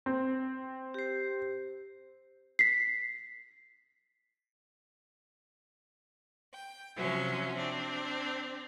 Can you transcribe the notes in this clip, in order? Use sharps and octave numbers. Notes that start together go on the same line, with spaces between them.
C4
G4 C5
B6 C7
G5
C3 F3 F#3 C#4 E5
C4 D4